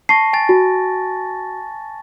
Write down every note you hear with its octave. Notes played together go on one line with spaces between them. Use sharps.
A5 C#6 A#6 C7
G#5 A6
F#4